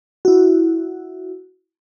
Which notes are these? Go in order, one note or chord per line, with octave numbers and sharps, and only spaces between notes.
E4 F#4